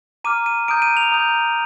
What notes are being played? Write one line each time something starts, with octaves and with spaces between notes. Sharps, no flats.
A#5 D6 F6 D#7
D#7
A#5 D#6 G6 D7
D#7
F7
A#5 D#6 G6